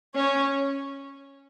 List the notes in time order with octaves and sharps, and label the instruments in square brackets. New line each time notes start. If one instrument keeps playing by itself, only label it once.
[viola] C#4 [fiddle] C#5